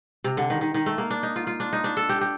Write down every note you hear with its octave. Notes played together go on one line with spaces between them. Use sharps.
C3
D3
D#3
D#3
D#3
A3
A#3
D4
D#4
F4
F4
D4
D#4
D4
A4
G4
G4